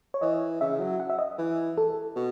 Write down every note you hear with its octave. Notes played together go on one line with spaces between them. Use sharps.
C#5
E3 D#5
C#3 E5
F#3
F#5
E5
D#5
E3
A4
B2